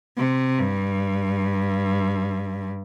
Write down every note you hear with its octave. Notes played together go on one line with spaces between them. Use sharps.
C3
G2